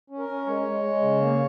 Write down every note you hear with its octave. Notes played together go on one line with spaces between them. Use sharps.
C#4
A#4
C#4
G#3 C#5
G#3
G#3
C#3
A#3